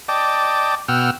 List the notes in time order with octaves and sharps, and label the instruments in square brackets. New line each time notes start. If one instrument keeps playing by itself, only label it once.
[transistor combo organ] D5 D#5 G5 A5 D6
B2 F#5 G5 E6 F6